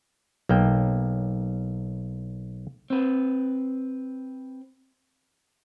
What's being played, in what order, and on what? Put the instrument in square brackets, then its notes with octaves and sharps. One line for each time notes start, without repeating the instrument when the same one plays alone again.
[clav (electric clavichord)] B1 A#3 G5
[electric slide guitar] C4 B4